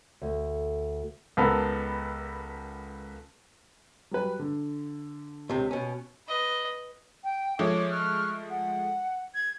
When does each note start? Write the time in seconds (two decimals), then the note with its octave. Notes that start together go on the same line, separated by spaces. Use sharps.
0.22 D2
1.37 C#2 B3 A4 A#4 B5
4.11 F#3 G3 B4
4.39 D3
5.49 C#2 C3
5.71 B2 C#4
6.28 B4 D#5
7.23 G5
7.59 F3 G#3 A3 C#5 D6
7.90 C#6 F6 F#6
8.50 F#5
9.35 G#6